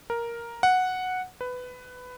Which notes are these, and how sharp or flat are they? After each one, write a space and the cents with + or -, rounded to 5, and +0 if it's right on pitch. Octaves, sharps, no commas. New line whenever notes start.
A#4 +5
F#5 -5
B4 +15